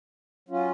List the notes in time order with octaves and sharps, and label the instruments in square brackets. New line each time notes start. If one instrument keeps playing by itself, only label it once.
[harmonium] F#3 C#4 F4